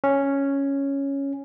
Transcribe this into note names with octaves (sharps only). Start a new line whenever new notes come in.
C#4